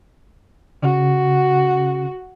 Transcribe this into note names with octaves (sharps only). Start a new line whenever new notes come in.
C#3 F#4